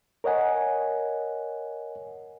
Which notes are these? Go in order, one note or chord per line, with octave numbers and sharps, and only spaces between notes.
A#4 C#5 D#5 F#5 G#5